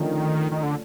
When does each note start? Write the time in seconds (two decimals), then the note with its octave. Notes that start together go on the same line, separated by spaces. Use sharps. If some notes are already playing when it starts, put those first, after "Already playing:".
Already playing: D3 D#3 F3 A3 C#4
0.52 D#3
0.63 D3